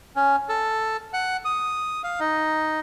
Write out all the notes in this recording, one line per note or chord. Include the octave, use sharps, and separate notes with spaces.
C#4
A4
F#5
D#6
F5
D#4